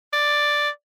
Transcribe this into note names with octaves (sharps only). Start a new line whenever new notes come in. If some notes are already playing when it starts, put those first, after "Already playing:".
D5